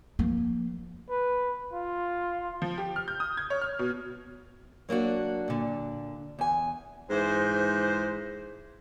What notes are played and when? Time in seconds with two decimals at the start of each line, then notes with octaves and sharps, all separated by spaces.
0.19 F3 A#3
1.10 B4
1.73 F4
2.62 F3
2.78 G4
2.96 F6
3.08 G6
3.20 D#6
3.37 G#6
3.50 C#5
3.61 F6
3.79 B2
4.89 F#3 A#3 D4 F#4
5.48 A#2 D3
6.39 E2 G#5
7.10 G#2 E3 C5